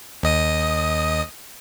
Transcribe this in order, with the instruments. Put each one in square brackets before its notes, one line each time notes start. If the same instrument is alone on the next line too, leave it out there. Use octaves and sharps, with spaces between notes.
[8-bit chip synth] D#2 D#5 D#6